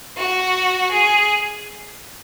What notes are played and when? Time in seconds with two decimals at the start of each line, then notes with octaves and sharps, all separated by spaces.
0.17 F#4
0.91 G#4